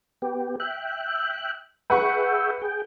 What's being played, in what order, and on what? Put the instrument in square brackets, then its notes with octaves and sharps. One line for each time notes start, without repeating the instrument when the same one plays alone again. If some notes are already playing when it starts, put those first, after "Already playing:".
[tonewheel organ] B3 G4
E5 G5 F#6
[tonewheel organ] G#4 E5 G5 [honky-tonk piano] B4 F#5 C#6
[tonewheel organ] G#4 G5